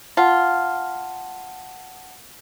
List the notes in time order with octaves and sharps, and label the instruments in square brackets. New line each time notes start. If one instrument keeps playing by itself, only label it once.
[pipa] F4 [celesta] F#5 A5